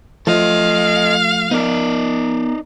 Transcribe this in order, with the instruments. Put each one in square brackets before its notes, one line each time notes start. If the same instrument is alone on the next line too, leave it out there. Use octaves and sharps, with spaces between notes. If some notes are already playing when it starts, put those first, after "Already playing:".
[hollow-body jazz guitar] F3 [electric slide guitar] A3 [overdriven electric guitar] A4 D#5 [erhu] F5
[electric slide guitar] B3 A#4 [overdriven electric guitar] D#4 D5